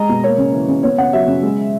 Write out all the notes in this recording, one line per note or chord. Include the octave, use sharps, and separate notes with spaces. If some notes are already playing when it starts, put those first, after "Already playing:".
Already playing: G#3 D#5 A#5
B2
A#3 C#5
C#3
E3
C#3
B3 C#5
C#3 F#5
F#3 E5
C#3
G#3